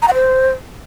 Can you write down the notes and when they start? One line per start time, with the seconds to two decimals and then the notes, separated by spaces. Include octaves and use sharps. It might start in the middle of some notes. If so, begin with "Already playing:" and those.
0.02 A#5
0.08 F#5
0.14 C5